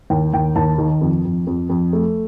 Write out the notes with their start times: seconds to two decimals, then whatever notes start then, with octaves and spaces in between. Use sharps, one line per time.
0.10 D#2 G5
0.34 D#2 G5
0.56 D#2 A5
0.78 D#3
1.01 F2
1.25 F2
1.47 F2
1.70 F2
1.93 A3